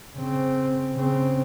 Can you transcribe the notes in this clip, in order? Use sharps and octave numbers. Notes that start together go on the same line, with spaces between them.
C#3 C4
C#3 C4